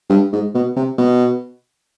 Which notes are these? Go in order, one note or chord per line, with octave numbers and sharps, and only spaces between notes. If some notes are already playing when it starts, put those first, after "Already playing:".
G2
G#2
B2
C3
B2